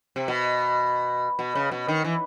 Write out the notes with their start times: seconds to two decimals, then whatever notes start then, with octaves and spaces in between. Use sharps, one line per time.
0.16 C3
0.28 B2
1.39 B2
1.55 C#3
1.72 B2
1.88 D#3
2.04 E3